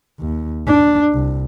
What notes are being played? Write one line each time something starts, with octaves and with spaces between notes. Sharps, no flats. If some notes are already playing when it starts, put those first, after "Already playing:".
D#2
D4
C2